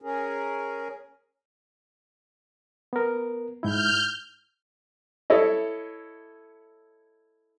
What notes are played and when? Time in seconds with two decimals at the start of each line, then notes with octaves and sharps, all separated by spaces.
0.02 C#4 G#4 A#4
2.93 B3 A#4
3.63 G#2 E4 F6 G6
5.30 E4 A4 C#5 D#5